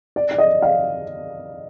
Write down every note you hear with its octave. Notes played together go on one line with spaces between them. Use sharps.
D5
D5
D#5
F5